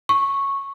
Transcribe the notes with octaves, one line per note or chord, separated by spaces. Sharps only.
C#6